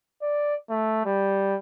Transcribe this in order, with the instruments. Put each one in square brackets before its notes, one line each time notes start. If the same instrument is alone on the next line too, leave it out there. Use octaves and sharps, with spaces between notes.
[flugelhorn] D5
A3
G3